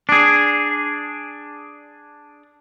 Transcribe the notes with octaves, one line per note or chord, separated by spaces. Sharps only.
D4 G#4